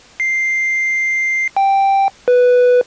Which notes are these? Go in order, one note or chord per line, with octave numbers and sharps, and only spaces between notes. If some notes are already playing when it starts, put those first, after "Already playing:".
C7
G5
B4